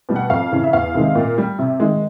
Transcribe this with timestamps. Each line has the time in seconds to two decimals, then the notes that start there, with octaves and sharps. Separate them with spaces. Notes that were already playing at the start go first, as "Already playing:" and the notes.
0.09 B2 G3
0.16 F#5
0.30 F2 F5
0.51 C#3 E3
0.64 E5
0.73 E2 F5
0.94 C3 D#3 G#3
1.15 A#2
1.38 G3
1.59 C3
1.80 D#3 G#3